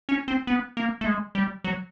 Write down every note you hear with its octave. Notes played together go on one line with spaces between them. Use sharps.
C#4
C4
B3
A#3
A3
G#3
G3
F#3